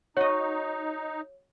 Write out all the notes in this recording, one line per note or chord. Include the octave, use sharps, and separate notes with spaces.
D#4 F#4 C#5 D#5